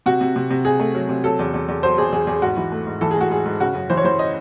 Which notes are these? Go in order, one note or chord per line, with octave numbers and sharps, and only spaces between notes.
C3 F#4
C3
C3
C3
C3 G#4
A3
F#3
C3
F#3 A4
E2
E2
E2
F#3 C5
E2 G#4
E2 G#4
E2 G#4
G#2 F#4
E3
A3
G#2
E3 A4
G#4
A3 F#4
G#2 G#4
G#2
C#3 F#4
F#2
E3 C5
C#5
E3 C5
D#5